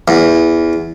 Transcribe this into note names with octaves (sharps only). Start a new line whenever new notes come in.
E2